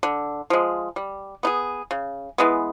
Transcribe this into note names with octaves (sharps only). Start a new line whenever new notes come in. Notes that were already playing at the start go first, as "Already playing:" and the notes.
D3
F3 G#3
G3
B3 D#4 G#4
C#3
E3 G#3 B3